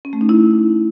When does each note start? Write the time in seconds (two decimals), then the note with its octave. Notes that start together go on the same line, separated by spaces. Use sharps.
0.05 C#4
0.13 A3
0.21 D#4
0.29 E4